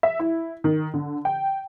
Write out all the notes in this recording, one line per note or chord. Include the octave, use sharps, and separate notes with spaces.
E5
E4
D#3
D3
G5